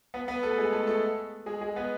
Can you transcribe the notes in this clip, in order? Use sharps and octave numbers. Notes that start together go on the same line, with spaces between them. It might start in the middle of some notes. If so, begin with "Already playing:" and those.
B3 B4
B3 B4
A3 A4
G#3 G#4
A3 A4
A3 A4
G#3 G#4
G#3 G#4
B3 B4